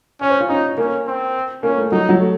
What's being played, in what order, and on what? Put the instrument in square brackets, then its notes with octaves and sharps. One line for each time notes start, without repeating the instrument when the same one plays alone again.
[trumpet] C#4 [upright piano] C#5
[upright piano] C5
F4
[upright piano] C#4 [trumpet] D#4
[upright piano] A#3 [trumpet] C#4
[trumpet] C4
[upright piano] A#3 [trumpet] C#4
[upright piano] A3
[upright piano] F#3 [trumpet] D#4
[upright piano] F#3
A3